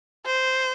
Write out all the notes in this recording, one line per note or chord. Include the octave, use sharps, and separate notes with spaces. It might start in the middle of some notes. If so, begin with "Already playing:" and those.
C5